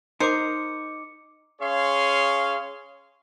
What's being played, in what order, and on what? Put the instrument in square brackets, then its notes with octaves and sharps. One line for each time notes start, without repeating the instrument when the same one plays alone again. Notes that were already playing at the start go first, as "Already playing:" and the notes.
[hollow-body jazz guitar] D#4 A#4 [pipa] C5 [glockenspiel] D6 C#7
[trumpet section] C#4 G#4 C#5 F5 C6